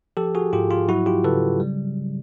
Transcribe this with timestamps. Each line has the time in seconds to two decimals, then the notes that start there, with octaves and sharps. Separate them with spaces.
0.17 F3 G4 A4
0.35 F#4 G#4
0.53 G#2 F4 G4
0.71 F4
0.89 F#3 E4 F#4
1.06 F4 G4
1.24 C#3 A4 B4
1.60 G3